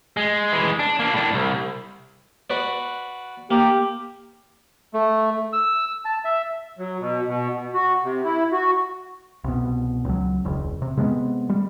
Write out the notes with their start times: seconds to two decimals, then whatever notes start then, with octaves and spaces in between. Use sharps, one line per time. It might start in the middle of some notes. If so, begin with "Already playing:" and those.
0.17 G#3
0.53 E3 G#3
0.79 D4
0.99 A#3 D4
1.14 A2 D4
1.34 C2
2.50 F#4 B4 D5
3.51 A#3 G4
4.93 A3
5.53 E6
6.05 A5
6.25 E5
6.79 F#3
7.00 B2
7.28 B2
7.55 B2
7.74 F#4
8.04 C3
8.24 E4
8.52 F#4
9.44 C2 B2
10.05 C#2 F#3
10.45 E1 C#2
10.82 C3
10.97 C3 G#3 A3 B3
11.49 G3